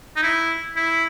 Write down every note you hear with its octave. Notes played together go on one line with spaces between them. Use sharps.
D#4
E4
E4